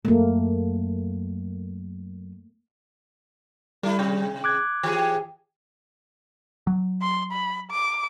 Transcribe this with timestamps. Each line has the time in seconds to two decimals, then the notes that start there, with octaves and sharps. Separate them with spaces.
0.05 F#2 A3 A#3
3.83 G3 A3 E4
3.99 C3 G#3
4.44 D6 F#6 G#6
4.83 E3 G4 G#4
6.67 F#3
7.02 C6
7.32 B5
7.71 D6